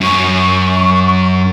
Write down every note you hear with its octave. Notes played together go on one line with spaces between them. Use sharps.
F#2 C#6